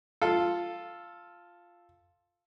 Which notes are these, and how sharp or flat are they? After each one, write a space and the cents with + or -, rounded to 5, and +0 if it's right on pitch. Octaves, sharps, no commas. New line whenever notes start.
F4 +0 A4 +0